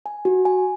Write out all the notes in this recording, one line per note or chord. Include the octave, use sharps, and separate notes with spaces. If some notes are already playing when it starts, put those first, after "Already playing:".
G#5
F#4
G#5